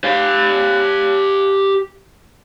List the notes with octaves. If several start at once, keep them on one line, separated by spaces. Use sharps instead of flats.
G4 F5